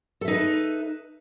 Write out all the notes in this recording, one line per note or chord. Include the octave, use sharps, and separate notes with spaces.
D#4 A4 B4 E5